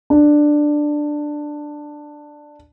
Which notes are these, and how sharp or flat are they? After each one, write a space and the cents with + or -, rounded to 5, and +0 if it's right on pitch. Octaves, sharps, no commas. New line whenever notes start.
D4 +10